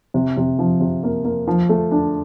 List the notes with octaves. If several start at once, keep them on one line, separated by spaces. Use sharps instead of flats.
C3
C3
F3
C3
A#3
A#3
F3
A3
D4